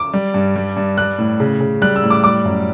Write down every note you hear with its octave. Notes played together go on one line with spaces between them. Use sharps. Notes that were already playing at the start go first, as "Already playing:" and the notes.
Already playing: D6
G3
G2
G3
G2
G3 F#6
A2
C#3
C#3
G3 F#6
E6
A2
D6
G3 D6
F#2